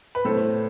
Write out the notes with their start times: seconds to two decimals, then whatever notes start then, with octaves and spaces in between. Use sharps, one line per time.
0.15 B4
0.25 A2 A4 C5